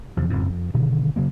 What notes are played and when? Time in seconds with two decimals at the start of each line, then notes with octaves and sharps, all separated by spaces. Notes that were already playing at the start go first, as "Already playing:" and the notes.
0.17 E2 C3 F3
0.30 F#1 F2 G#2
0.48 F2
0.74 G2 B2 D3 D#3
1.16 C#3 F#3 A#3